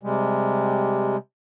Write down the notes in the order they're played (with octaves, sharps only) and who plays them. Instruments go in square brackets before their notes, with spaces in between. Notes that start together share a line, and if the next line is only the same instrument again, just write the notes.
[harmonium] C3 G3 G#3